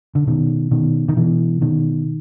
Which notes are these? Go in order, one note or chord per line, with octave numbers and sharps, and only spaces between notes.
D3
B2 D#3
B2 D#3
D#3
B2 E3
B2 D#3